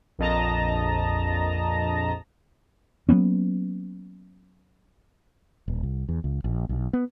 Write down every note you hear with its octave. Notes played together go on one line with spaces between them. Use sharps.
A#1 F2 D#5 A5 A#5 A#6
F#3 A#3 B3 C#4
D#1
C2
E2
C#2
A#1
B1
B3